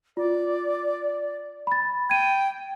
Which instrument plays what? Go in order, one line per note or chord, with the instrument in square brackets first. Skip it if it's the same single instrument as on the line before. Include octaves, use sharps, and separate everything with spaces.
[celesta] F4 [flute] D5
[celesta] B5 A6
[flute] G5 [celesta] G#6 D#7